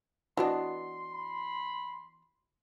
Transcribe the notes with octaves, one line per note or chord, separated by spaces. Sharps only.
E3 B3 D4 E4 F#4 D#5 C6
B5